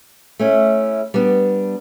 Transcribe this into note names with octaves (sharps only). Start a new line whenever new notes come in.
A3 C#4 E4
G3 B3 D4